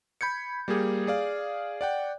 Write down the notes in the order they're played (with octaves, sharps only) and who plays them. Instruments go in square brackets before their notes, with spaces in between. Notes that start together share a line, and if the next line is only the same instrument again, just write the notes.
[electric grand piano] B5 G6 G#6 C#7
G3 A#3 G4 G#4
G#4 D5 F5
D5 F#5 G5